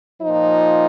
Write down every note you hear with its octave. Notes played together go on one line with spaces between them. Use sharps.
A#2 F3 D#4